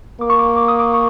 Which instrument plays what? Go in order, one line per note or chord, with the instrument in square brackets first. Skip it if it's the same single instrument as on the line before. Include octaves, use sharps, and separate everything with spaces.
[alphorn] A#3 [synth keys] D6
[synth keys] C#6
D6
D6
D#6
D6
C#6